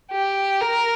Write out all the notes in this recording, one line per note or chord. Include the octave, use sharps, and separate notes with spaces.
G4
A#4